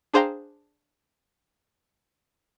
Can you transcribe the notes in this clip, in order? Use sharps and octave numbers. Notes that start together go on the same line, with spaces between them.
D4 G#4 C5 F5 G5 A#5